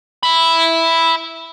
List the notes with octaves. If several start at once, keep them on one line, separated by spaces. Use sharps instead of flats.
E5 B5